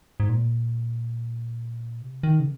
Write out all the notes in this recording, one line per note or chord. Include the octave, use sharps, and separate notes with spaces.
G#2
A#2
C3
D#3
C#3